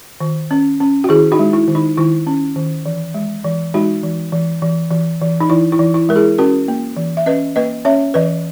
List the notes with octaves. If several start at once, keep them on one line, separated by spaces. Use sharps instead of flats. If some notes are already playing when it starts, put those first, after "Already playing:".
D#3
C#4
C#4
F#4
D#3 E4 G#4
D#4 F#4
G#3
E4
D#3
D#4
D#3 E4
C#4
D#3
E3
G#3
E3
G#3 D#4 F#4
E3
E3
E3
E3
E3
D#4
E3 E4
E4
E3
E4
G#3 A#4
E4 G#4
C#4 F#4 A#4
A#3
E3
E5
C#4 B4 D#5
A#3 B4 D#5
C#4 C#5 E5
E3 B4 D#5